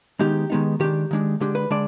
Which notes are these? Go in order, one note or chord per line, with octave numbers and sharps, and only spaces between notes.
D#3 G#3 B3 D#4 G4
D#3 G#3 B3 D#4
D#3 G#3 D4 G4
D#3 G#3 D4
D3 G#3 D4 G4
B4
D3 G#3 D4 D5